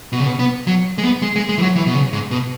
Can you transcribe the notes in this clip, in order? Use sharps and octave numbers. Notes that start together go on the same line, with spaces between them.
B2
C#3
B2
B3
F#3
G#3
B3
G#3
G#3
G#3
E3
F#3
E3
B2
C#3
G#2
B2